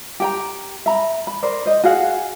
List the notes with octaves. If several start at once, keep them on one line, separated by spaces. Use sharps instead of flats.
G4 G5 A#5
E5 A#5 B5
B5
A#4 C5 D5
C5 D#5
F#4 G#4 F5 F#5